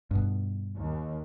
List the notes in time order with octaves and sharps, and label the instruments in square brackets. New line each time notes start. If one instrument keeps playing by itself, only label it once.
[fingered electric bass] G2 B2
[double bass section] D#2